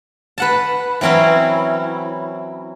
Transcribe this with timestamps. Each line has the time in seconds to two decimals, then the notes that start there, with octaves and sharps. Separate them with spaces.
0.38 B4 F#5 A5
1.01 E3 F#3 C4 C#4 E4